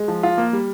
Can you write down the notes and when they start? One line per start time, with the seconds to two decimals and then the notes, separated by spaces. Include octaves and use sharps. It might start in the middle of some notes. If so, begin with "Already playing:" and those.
Already playing: G#3
0.08 F3
0.23 F4
0.38 A#3
0.53 G3